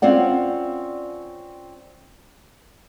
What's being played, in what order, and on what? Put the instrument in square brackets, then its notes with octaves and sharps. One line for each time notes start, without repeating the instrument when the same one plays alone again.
[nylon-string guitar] C4 C#4 F4 D5 F#5